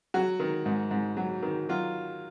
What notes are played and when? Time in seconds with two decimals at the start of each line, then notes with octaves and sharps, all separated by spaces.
0.14 F#3 F#4
0.39 D#3
0.66 G#2
0.91 G#2
1.17 F#3
1.42 D#3
1.69 F#3 F4